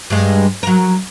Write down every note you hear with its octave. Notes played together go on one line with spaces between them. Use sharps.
G2 G#3
F#3 A#4